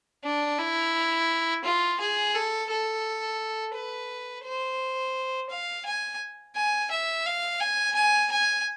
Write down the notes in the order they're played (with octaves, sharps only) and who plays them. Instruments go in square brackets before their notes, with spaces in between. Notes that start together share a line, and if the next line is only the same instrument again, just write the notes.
[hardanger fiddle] D4
E4
F4
G#4
A4
A4
B4
C5
F5
G#5
G#5
E5
F5
G#5
G#5
G#5